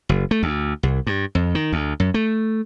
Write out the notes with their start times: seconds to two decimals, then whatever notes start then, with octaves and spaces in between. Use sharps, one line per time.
0.09 F#1
0.31 A3
0.43 D2
0.83 C2
1.07 G2
1.35 F2
1.55 D#3
1.72 D2
2.00 F#2
2.14 A3